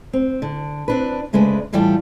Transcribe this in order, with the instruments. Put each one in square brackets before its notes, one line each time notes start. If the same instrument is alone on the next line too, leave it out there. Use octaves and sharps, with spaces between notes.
[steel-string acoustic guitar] C4
D3
C4 D4 B4
D2 C#3 G#3 A3 D4 B4
A2 E3 G3 F4 G4 A4